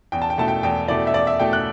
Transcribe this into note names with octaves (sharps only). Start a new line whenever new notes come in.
E2 G5
A5
G5
B2 A3 E4 A5
G5
E2 G5
B2 A3 E4 D5
E5
E2 D5
E5
B2 A3 E4 G5
F#6